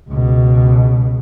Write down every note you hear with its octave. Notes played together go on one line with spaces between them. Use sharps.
C#2 B2